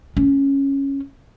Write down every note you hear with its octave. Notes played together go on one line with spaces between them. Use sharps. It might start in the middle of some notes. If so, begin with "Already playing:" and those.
C#4